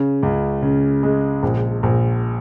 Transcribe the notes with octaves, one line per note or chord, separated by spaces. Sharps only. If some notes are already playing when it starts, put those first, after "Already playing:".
Already playing: C#3
C#2
C#3
G#3
A#1
A#1